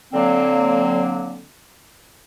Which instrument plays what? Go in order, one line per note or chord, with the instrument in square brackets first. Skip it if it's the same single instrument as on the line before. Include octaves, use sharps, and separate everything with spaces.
[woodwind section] D3 F#3 A#3 C4